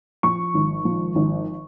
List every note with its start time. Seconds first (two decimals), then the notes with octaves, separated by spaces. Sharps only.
0.23 F3 C#6
0.54 G#1
0.85 F3
1.15 G#1